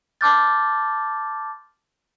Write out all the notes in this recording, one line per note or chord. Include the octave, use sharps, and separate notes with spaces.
A5 C6 D6 F6 G6 A6